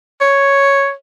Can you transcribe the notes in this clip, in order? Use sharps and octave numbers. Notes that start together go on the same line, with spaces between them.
C#5